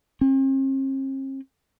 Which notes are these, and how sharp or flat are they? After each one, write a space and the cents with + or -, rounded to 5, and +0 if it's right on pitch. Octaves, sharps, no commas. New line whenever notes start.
C4 +45